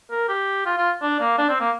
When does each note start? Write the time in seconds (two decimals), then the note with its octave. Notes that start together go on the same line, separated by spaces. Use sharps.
0.11 A#4
0.29 G4
0.66 F4
0.77 F4
1.02 D4
1.20 A#3
1.38 D4
1.49 C4
1.60 A#3